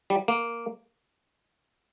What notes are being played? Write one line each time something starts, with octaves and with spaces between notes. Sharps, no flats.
G3
A#3